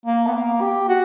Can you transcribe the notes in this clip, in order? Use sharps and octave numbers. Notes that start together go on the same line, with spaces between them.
A#3
B3
A#3
G4
F#4